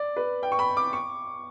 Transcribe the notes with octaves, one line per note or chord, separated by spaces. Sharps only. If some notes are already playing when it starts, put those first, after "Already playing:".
Already playing: D5
B4
G5
C#6
B5
D6
C#6